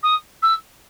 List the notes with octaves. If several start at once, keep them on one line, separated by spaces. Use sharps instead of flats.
D#6
E6